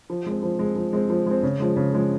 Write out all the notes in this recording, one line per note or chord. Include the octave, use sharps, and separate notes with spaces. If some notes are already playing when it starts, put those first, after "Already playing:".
F3
G#3 C4
F3
G#3 C4
F3
G#3 C4
F3
G#3 C4
C#3
F3 G#3
C#3
F3 G#3